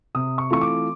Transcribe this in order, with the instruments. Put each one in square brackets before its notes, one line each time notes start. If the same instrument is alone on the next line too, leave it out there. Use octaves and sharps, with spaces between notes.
[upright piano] C3 D#6
C#6
E3 A3 C4 F4 C#6
D6